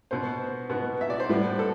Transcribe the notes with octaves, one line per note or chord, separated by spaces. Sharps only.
B2 B3 C5
B2 B3
E5
D5
C5
A2 G3 B3 B4
A4